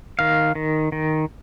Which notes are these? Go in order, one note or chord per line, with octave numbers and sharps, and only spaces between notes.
D#3 F5
D#3
D#3